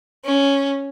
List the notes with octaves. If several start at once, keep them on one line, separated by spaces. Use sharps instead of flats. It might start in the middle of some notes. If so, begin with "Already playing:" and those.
C#4